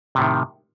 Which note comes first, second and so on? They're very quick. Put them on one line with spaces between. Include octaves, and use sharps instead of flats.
C3 A2 D#3